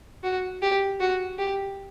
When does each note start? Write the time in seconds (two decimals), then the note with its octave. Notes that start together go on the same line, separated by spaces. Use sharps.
0.23 F#4
0.62 G4
1.00 F#4
1.38 G4